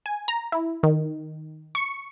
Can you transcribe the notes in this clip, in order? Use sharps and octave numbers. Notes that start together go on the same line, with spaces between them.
G#5
A#5
E4
D#3
C#6